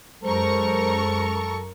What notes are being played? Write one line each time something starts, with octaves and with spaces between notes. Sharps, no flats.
F#2 G#3 A4 A#4 C5 C#6